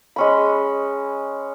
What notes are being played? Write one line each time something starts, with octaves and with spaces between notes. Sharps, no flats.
G#3 C#4 B5